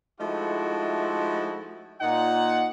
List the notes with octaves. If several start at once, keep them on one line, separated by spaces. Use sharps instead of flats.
F3 G#3 A3 D#4 E4 F#4
A#2 D#4 F#5